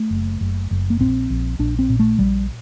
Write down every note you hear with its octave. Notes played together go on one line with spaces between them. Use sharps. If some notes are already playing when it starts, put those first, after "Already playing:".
Already playing: A3
F#1
F#1
F#1
A#3
A#1 C4
A#1
A#1 D4
C4
A#2
A3
A#1 G3